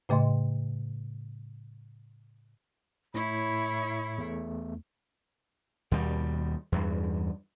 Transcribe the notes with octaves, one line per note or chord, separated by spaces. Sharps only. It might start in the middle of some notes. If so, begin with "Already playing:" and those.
A2 C#3 A3 D#5 C6
A2 E4 C#5 B5
E2 A3
D#2 B2 G3
E2 G2